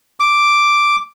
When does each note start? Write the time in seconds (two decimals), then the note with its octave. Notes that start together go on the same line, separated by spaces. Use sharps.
0.20 D6